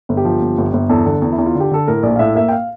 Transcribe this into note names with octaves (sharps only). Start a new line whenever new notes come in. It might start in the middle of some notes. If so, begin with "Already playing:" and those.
G1
G4
F3
G1
G1
G1
E2 A4
D3
E2
E4
E2
F4
D3
G4
D3 A4
A2 A#4
A#1 D5
F5
A2 E5
A#3 E5
G5
F5